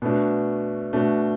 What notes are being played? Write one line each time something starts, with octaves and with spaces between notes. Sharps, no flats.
B2 A3 D4 F#4
B2 A3 D4 F#4